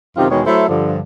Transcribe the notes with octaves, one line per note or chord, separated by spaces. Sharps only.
F#2 C3 D#3 C4 F4 G4
E2 B2 D#3 G#3 B3 C#5
F#3 A3 E4 A4 C5 E5
G2 D3 F3